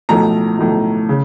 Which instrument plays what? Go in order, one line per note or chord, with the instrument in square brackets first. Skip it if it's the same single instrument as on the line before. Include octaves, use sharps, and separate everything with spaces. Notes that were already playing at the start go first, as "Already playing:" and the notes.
[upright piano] B1 A2 F3 A#5
B1 A2 F3
C#3